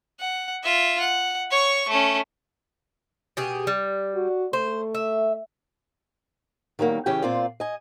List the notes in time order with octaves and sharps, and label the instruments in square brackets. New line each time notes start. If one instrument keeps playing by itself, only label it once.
[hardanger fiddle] F#5
F4 E5
F#5
C#5 C#6
A3 C#4
[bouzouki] B2 G4 G#4
G3
[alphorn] F#4
[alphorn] A3 [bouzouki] C5
[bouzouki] E5
[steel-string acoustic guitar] D#3 F#3 G3 A#3
C#3 E3 C#4 G4 G5
A#2 C4 F4 D5
D#5 G#5